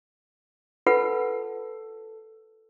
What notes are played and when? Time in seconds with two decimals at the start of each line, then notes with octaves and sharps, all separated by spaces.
0.86 F4 A4 B4 F#5